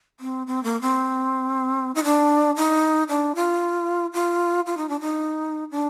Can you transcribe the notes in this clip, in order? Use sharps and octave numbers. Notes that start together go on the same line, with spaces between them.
C4
C4
A#3
C4
D#4
D4
D#4
D4
F4
F4
F4
D#4
D4
D#4
D4